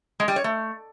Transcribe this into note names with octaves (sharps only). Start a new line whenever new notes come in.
G#3
G3
C#5
A3